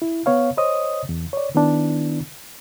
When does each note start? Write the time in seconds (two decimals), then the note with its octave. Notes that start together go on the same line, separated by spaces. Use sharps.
0.02 E4
0.26 B3 C#5 F5
0.57 C5 C#5 D#5 D#6
1.09 E2
1.33 C#5 D5
1.55 D#3 B3 D4 E4